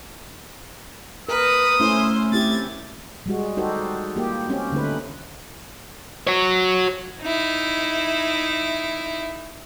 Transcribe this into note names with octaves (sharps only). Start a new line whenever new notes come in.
A#4 B4 D#6
A3 C#4 E4 C5
C4 E4 G4 G#6 A6
G3 G#3 F#4
D#4 F#4 G4 A4 C5
A#3 F4 G4
C4 C#4 G4
D3 A3 D#4 B4
F#4 C#5
D#4 E4